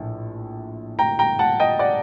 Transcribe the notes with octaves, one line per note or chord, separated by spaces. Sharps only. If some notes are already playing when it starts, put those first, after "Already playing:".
Already playing: A#1 A2
G5 A#5
G5 A#5
F#5 A5
D#5 G5
D5 F#5